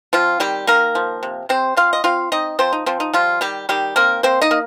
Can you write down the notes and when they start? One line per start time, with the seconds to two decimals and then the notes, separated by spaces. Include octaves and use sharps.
0.13 F3 C4 F4
0.40 D#3 G3 G4
0.67 D#3 A#3 A#4
0.95 F3
1.23 C3
1.49 C3 C4 C5
1.77 C4 F4 F5
1.93 D#5
2.04 C4 F4 F5
2.32 C4 D#4 D#5
2.59 F3 C4 C5
2.73 D#4
2.86 F3 C4
3.00 D#4
3.14 F3 G3 F4
3.41 D#3 G3 G4
3.69 D#3 G3 G4
3.96 A#3 C4 A#4
4.23 A#3 C4 C5
4.41 D#4 D#5
4.51 A#3